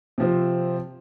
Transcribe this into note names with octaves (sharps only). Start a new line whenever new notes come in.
C3 F3 C4